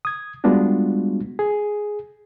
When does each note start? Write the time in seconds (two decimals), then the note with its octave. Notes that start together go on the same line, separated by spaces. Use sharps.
0.05 D#6 G#6
0.44 G3 G#3 B3 D4 F4 F#4
1.39 G#4